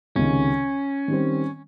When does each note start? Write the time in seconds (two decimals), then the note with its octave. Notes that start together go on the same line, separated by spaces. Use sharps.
0.16 C#2 C3 D#3 C#4
1.08 D#3 G3 C4